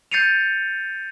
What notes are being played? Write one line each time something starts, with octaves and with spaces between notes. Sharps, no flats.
G6 A6 C7 C#7 D#7 F7